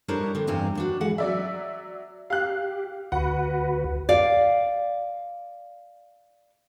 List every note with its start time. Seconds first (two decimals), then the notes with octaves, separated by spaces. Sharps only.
0.08 G3 D4 E4 A#4 C5 C#5
0.35 D3 C4
0.47 E2 G2 C4 G4 G#5
0.75 D#2 D4 F#4
1.01 E3 G#3 F#5
1.18 F#3 D5 E5
2.30 G4 F5 F#6
3.12 D2 F#4 B4 F#5
4.09 D5 F5